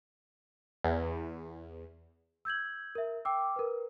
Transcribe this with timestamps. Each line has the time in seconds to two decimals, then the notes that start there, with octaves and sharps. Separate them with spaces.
0.84 E2
2.45 E6 G6 G#6 F#7
2.95 A#4 E5
3.25 G5 D6 E6
3.56 A#4 B4